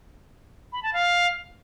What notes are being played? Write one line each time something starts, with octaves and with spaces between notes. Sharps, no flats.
B5
A5
F5